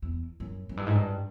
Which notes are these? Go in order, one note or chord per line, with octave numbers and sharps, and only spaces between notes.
E2
F#2
F#2
G2
G#2
G2